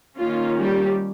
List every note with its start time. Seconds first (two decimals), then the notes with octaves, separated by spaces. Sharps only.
0.18 D#3 A#3 C#4 F4
0.59 G3 G4